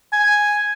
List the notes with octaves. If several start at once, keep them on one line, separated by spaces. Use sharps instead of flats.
G#5